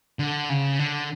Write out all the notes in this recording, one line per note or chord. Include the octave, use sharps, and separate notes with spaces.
D3
C#3
D3